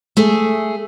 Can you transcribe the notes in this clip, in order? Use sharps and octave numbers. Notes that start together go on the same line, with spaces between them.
A3 G#4 E5